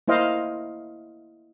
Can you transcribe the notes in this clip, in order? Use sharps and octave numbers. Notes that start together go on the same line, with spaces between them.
A#3 E4 C5 D#5 F5